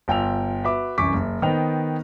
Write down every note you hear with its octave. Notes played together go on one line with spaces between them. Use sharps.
G1 F4 G5 G#5 E6 F7
F#4 B4 E5 D6
C2 F#2 E3 C#6 D6 B6
F#1
D#3 B3 C5 D#5 G5 F7